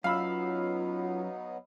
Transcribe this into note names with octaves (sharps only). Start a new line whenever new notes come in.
F#2 F#3 B3 D#4 F4 F5 B5 E6